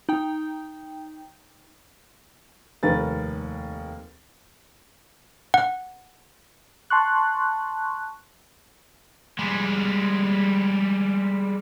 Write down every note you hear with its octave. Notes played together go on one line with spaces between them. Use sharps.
D#4 G5
F1 D#2 A#4 B4 A6
F#5
A5 C6 C#6 F#6
G3 G#3